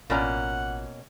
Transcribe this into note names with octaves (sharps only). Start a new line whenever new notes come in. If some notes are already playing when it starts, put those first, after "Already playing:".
A1 B2 A#3 C#4 F4 D5 F#5 A#5